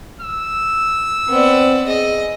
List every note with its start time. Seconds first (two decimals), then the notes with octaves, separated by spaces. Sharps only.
0.21 E6
1.29 B3 C4 D5
1.87 G#4 D#5